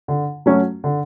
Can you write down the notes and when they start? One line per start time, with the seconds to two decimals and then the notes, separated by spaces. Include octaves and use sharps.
0.08 D3
0.46 F#3 A3 C#4 F#4
0.84 D3